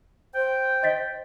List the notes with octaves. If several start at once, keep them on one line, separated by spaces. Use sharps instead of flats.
C5 G5
D#5 A6 B6